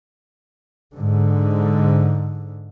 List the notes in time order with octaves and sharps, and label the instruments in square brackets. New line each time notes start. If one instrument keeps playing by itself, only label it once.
[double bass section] G#2 D3